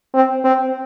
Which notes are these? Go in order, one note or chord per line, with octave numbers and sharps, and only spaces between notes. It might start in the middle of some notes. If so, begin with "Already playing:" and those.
C4
C4